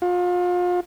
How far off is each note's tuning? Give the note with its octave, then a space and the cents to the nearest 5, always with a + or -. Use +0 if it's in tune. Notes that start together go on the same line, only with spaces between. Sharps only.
F4 +35